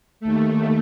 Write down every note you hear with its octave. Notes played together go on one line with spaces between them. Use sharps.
D#2 A3